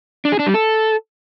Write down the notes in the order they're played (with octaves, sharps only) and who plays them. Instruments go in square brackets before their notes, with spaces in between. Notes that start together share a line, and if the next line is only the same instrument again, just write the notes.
[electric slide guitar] D4
G#4
D4
G3
A4